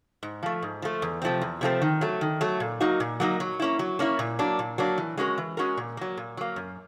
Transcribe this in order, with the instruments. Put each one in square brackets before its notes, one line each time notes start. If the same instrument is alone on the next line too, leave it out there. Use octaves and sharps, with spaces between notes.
[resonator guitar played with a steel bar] G#2
F3 A3
G#2
F3 A3
E2
C3 F3 A3 C4
E2
C3 F3 A3 C4
D#3
F#3 A3
D#3
F#3 A3
A#2
F#3 A#3 D#4 F#4
A#2
F#3 A#3 D#4 F#4
F#3
A#3 C#4 E4
F#3
A#3 C#4 E4
A#2
F#3 A#3 D4
A#2
F#3 A#3 D4
E3
G#3 C#4 F#4 A#4
E3
G#3 C#4 F#4 A#4
A#2
F#3 A#3
A#2
F#3 A#3
F#2